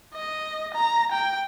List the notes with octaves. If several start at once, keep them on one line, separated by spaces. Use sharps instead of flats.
D#5
A#5
G5